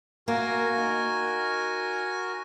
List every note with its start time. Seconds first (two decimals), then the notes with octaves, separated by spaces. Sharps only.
0.28 A#3 F#4 A#4 G#5
0.78 D#4